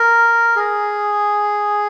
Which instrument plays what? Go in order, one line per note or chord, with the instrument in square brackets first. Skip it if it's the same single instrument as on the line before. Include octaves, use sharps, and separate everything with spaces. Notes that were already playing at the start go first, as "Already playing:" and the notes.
Already playing: [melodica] A#4
G#4